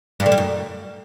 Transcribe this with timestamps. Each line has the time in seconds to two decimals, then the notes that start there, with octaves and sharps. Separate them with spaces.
0.20 G2
0.26 D3
0.32 G3
0.38 F#2